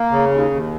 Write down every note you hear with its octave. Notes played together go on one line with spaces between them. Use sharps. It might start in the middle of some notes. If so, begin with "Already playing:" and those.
Already playing: A#3
C#3
D#2
D#2